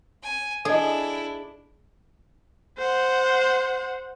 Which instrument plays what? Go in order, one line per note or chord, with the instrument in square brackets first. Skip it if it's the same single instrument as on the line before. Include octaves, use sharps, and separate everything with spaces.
[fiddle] G#5
[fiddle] D4 E4 [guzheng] G#4 [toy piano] A4 D#5
[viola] C5 F#5